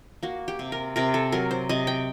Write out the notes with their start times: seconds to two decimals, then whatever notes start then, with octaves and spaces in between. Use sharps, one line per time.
0.23 A#3 F#4
0.48 G4
0.59 C3
0.72 A#4
0.96 C3 A#4
1.14 A4
1.32 F#3 A#4
1.51 C5
1.69 C3 D#5
1.87 G5